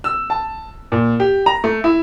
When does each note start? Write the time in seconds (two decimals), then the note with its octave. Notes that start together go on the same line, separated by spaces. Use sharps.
0.04 E6
0.30 A5
0.92 A#2
1.20 G4
1.46 A#5
1.64 A3
1.84 E4